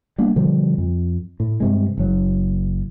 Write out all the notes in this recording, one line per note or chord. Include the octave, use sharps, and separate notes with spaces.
G3 A#3 B3 D4
B2 D3 F3 G3
F2
A2
G2 C3 G#3
F#1 F#3